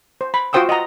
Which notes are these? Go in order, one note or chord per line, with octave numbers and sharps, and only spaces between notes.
C5
B5
F4 F#4 C5 G5 D#6 E6
D#5 F#5 A#5